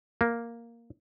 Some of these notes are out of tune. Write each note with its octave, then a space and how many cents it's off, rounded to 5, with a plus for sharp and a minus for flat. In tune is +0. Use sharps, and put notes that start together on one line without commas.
A#3 +0